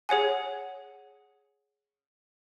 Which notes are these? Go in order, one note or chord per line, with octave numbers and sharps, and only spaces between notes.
G#4 C#5 F#5 G#5